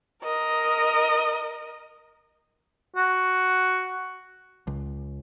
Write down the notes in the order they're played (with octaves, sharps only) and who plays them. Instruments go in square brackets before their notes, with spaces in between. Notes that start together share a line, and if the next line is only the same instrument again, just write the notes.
[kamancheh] A#4 D#5
[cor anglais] F#4
[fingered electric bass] C#2